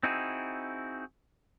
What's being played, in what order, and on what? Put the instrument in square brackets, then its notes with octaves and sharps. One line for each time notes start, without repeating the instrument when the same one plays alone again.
[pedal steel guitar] C4 D#4 E4 F#4 G#4